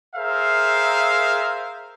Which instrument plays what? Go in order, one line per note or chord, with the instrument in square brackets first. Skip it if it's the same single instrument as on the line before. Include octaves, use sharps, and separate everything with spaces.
[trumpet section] G#4 A#4 C5 E5 F5